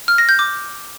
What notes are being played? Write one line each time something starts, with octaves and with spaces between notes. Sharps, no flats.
F6
A#6
G6
D6